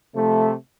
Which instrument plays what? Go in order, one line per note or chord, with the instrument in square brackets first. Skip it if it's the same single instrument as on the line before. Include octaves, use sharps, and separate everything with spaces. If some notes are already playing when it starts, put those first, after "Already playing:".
[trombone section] C3 F3 A3